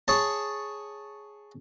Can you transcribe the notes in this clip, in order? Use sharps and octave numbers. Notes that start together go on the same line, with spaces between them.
G#4 C#5 A5